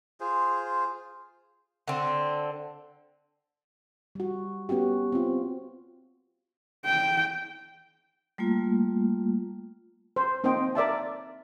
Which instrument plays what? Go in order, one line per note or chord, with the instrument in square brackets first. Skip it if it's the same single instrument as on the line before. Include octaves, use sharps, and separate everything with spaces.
[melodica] F4 G#4 C5
[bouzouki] D3 C4
[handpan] G3 F#4
B3 C#4 F#4 G4
C4 F4
[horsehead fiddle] G5
[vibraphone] G3 A3 A#3 F4
[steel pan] C5
A#3 C4 D#4 C5 D#5 G5
A#4 D5 E5 A5